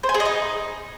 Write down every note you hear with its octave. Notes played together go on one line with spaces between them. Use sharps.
C5
G#5
G#4
D#5
D#4